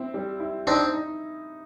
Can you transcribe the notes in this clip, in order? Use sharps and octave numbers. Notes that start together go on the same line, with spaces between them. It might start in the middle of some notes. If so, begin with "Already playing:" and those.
Already playing: C4 E4
G3
E4
C4 D4 D#4
D#4